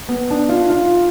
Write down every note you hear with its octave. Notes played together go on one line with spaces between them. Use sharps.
B3
D4
F4
F4